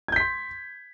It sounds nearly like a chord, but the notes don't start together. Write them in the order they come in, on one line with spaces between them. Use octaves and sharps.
G#6 G6 B6 C6